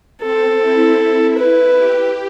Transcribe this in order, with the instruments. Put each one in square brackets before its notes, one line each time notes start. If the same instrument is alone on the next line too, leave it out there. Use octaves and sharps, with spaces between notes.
[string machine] C4 [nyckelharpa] A4
[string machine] E4
[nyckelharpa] B4
[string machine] G4